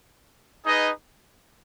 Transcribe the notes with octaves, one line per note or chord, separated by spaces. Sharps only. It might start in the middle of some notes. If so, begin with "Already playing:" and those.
D#4 G#4 B4 D#5